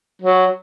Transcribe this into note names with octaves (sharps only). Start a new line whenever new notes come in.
F#3